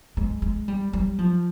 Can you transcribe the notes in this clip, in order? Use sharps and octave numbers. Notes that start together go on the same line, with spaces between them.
G#3
G#3
G3
G3
F3